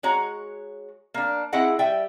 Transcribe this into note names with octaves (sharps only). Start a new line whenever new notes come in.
G#3 F#4 C#5 A#5
A#3 D4
C4 E4 G#4 D#5 F#5
G3 E5 G5